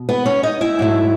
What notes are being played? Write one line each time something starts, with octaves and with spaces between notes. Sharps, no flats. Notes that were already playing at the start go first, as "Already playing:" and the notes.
Already playing: B2
B3 B4
C#4 C#5
D#4 D#5
E4 E5
G#2 F#3 A3